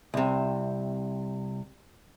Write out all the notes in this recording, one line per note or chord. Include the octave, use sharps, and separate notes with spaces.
C2 C3